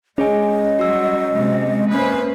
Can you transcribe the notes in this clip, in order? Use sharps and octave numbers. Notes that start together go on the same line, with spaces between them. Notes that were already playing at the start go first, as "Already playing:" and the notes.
G#3 C#4 G#4 C#5 D#5 G#5
F#3 G3 F#4 E6
C3 G#3
A#3 C#4 B4 C5